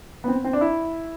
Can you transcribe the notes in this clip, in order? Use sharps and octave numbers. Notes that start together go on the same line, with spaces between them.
B3
C4
C4
D4
E4